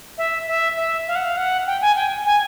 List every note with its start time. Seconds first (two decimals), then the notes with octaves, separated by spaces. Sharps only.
0.18 E5
0.48 E5
0.77 E5
1.08 F5
1.15 F#5
1.25 F5
1.37 F#5
1.67 G5
1.82 G#5
1.96 G5
2.26 G#5